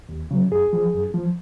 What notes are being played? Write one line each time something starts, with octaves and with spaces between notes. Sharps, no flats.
D#2
C#3 F#3
F#2 G#4
F3
F#2
F3